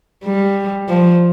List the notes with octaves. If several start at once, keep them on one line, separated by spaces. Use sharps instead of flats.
G3
F3